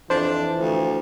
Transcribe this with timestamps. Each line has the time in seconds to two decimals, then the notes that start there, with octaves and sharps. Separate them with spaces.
0.10 F2 E3 D4 C5
0.59 D2 F3